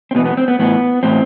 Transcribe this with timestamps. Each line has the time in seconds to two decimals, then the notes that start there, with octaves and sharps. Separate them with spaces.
0.11 C4
0.15 E2 B2 B3
0.26 B3
0.37 C4
0.48 B3
0.59 A2 E3 B3
1.03 A2 E3 C4